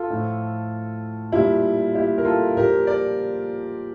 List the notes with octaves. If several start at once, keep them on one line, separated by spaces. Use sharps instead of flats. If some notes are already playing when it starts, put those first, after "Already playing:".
Already playing: F4 A4
A2 F3
A#2 G3 E4 G4
E4 G4
A#4
F4 A4
A#2 F3 G4 A#4
A#4 D5